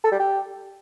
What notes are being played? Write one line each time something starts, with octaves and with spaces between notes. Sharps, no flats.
A4
G3
G4